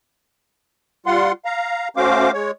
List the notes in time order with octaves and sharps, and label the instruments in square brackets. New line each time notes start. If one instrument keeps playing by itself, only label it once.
[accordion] G3 F4 F#5 C6
F5 A#5
A3 C#4 F#4 C5 F5 D6
G#3 C#5